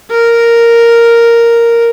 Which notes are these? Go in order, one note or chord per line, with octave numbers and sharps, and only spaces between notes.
A#4